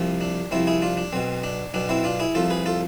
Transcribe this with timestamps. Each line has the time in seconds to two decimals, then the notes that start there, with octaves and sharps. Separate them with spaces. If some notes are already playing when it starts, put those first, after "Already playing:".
Already playing: C2 C3 F3
0.21 D4
0.51 C2 C3 F3 C4 E4
0.67 E4 G#4
0.82 D4 F4
0.97 D4
1.13 B1 B2 C4
1.43 D4
1.74 B1 B2 D4
1.89 C4 E4
2.04 D4 F4
2.20 E4 G#4
2.35 C2 C3 F3 F4 A4
2.50 G#4 B4
2.66 F4 A4